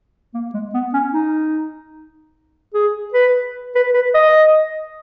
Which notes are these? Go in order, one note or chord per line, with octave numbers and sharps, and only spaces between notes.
A#3
G#3
B3
C#4
D#4
G#4
B4
B4
B4
D#5